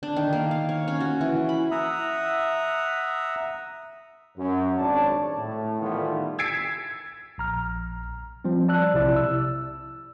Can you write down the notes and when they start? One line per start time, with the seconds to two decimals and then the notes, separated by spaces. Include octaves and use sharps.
0.03 D4
0.16 D#3
0.33 A#3
0.51 F5
0.69 C#5
0.88 C#4
1.00 F#4
1.21 E3
1.49 B5
1.71 E5 F#5 A#5 D#6 E6
4.37 F#2
4.78 G#1 G2 D4 C#5 D5 A5
5.36 A2
5.81 D#3 E3 G3 A3 B3 F4
6.39 E6 G#6 A6 B6 C7 D7
7.38 A#1 A#5 F6
8.45 F3 G3 C4
8.68 D5 A5 E6 F#6
8.94 B1 C3 E4 D5
9.16 E6